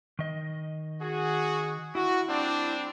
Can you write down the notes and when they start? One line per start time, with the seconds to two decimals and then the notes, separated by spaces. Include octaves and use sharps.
0.19 D#3 D#5
1.02 F#4 G#4
1.95 E4 F#4
2.29 G3 C4 D4